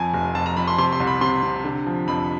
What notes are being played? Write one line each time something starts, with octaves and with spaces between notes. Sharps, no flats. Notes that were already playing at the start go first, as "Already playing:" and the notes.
Already playing: F2 G#5
F1
F2 A5
A#5
F2 B5
C6
C3 C6
C6
C2
B5
C3 C6
C3
D3
F3
F2 B5